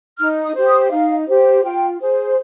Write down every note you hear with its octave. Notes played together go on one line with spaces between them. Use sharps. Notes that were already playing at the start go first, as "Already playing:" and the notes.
D#4 F6
D#6
G4 C5
D#6
D#4 F5
G4 C5
F4 G5
G#4 C5